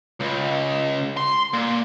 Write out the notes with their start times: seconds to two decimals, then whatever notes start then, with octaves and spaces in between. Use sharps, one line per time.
0.21 C#2
1.17 C6
1.53 A#2